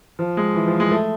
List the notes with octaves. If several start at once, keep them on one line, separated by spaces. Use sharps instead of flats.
F3
G#3
E3
F3
G#3
A3